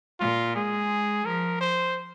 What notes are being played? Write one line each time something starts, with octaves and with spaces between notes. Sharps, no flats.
A#2 F4
G#3 G#4
F3 A#4
C5